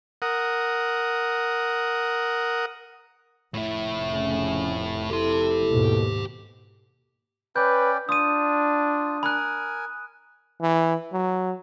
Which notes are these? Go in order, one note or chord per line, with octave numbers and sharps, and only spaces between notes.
A#4 F#5 D#6
F1 A2 E4
C#3 C#4
E4 G4 A4 C6
D#2 G#2 B2
C#4 B4 D5 G5 G6
D4 F4 D#6 D#7
A#4 G#5 B5 F#6
E3
F#3